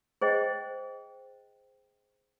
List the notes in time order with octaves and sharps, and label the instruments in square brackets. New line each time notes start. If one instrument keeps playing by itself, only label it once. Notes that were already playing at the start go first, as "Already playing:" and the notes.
[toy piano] G#4 C5 D#5 G5